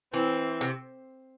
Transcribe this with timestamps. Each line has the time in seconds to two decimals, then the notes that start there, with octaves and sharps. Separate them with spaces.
0.13 E3 C4
0.61 C3